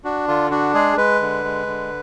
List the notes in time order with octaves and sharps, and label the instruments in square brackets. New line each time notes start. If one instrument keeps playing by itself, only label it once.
[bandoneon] D4 F#4
D3 F4
D4 F#4
G#3 G#4
G#3 B4
D3
G#3
D3